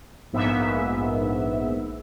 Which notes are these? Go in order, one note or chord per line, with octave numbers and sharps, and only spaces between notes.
A#1 G#2 A#3 B3 E5